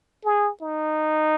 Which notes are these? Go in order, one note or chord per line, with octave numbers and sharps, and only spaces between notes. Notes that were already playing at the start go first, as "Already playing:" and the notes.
G#4
D#4